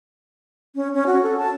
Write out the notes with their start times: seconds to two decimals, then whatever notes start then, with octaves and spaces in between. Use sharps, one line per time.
0.75 C#4
0.94 C#4
1.07 F#4
1.23 A4
1.37 A5